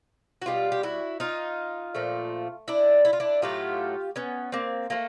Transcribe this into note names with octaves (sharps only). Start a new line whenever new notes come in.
F#4
B2 G3 F4 G4
G4
E4 F#4
D#4 F4
A#2 F3 A3
D4 E4
E4
F4
D4 E4
A2 F#3 A3 F4 G4
B3 C#4
A#3 C4
F3 A3 A#3